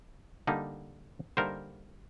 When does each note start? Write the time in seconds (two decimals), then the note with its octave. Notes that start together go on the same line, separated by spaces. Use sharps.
0.47 D3 G3 A#3 D#4
1.37 D3 G3 A#3 D#4 A#4 C5